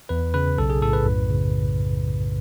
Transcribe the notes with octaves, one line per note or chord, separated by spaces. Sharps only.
E2 B4
C#3 B4
B1 A4
G#4
A2 A4
B4
F#2
C#3